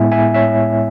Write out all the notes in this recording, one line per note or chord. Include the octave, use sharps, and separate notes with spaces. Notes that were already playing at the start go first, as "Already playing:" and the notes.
Already playing: A2 G#3 B3 E4 E5 G#5
E5 G#5
C#5 E5